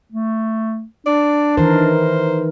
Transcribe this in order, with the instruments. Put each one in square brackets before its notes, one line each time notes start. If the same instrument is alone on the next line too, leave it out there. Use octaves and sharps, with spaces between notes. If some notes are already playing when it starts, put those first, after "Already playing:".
[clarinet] A3
[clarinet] D4 [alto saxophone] D5
[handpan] D#3 E3 A#4 [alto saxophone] C5